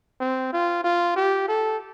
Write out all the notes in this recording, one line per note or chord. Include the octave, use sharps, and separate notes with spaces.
C4
F4
F4
G4
A4